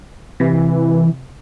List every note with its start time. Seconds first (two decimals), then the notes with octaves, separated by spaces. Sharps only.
0.40 C3 E3